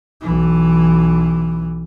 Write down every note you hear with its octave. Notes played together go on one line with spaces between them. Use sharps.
B1 E3